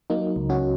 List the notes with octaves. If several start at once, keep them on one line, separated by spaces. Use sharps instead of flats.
F#3 A#3 D#4
C#2
C#4 F#4